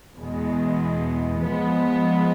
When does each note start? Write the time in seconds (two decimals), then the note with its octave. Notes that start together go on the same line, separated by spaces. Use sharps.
0.16 E2 B2 G#3
1.41 F3 G#3 B3